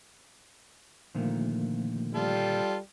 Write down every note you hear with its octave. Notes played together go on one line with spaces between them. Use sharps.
A#2 D3 D#3 F3 A3 A#3
G3 F4 A4